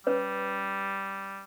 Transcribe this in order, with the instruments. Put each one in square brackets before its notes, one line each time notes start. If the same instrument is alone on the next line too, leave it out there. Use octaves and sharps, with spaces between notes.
[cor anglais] G3 [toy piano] C#4 B4 C#5